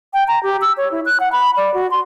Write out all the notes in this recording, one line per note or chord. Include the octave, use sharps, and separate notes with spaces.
G5
A#5
G4
E6
C#5
E4
F#6
F#5
B5
D5
F#4
C6